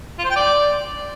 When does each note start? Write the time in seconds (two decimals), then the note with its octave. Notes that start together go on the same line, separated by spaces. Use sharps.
0.19 F4
0.25 C5
0.30 G5
0.36 D5